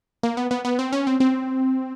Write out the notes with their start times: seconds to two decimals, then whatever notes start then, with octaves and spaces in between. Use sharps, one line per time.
0.23 A#3
0.37 B3
0.51 B3
0.65 B3
0.79 C4
0.93 C#4
1.07 C4
1.20 C4